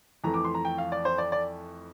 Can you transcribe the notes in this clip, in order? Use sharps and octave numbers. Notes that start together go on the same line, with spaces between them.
F2 E3 A3 A#5
D6
C6
A#5
G5
F5
D5
C5
D5
D5